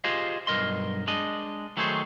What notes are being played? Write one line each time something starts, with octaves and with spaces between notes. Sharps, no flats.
F4 G4 G#4 C5 D#5 F5
B1 G2 C3 A#4 D#5 C6
G#3 D4 D#5
D#3 F#3 A3 D#4 G#4 C5